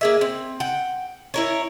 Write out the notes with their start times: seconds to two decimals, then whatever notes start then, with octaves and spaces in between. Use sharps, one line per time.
0.01 A#3 G#4 E5
0.21 C4
0.60 F#5 G5
1.34 E4 A#4 C#5